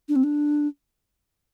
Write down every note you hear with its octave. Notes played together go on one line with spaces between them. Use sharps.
D4
C4
D4